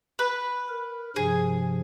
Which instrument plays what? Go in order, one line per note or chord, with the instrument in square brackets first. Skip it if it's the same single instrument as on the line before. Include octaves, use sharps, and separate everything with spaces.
[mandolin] B4
[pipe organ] A#4
[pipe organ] G2 C3 F3 [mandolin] G#4